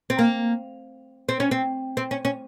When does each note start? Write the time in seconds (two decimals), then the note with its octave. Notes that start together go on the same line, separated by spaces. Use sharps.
0.10 C4
0.19 A#3
1.29 C4
1.40 C#4
1.51 C4
1.97 C4
2.11 C#4
2.25 C#4